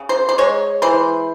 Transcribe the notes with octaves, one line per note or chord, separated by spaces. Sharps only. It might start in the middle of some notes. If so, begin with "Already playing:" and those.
Already playing: C#3
C5
C5
G#3 C#5
E3 C5